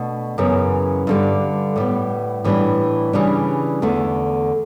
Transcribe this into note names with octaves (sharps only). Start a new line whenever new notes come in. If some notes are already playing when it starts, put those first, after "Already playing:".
Already playing: B2 A3 D4
F#2 C#3 E3 B3
G2 D3 G3
A2 G3 B3
A2 E3 G3 B3 D4
C#3 E3 G3 D4
E2 D3 A3